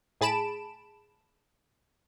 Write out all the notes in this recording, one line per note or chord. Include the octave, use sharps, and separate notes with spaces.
A2 G#4 A5 B5 D7 E7